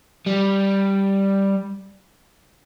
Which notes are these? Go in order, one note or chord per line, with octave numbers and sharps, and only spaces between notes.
G3